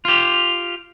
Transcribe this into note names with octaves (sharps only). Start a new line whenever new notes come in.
F4 G4